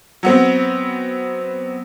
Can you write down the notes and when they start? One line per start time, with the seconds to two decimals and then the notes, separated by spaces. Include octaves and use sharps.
0.23 F#3 B3 C4